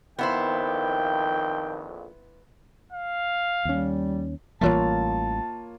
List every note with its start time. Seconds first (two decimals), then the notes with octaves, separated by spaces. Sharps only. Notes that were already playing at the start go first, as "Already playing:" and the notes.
0.19 A#1 F2 D#3 B3 E4 C5 G5
2.92 F5
3.65 D#2 G3 C#4
4.61 A1 E3 G3 A#3 F4 C#5 A5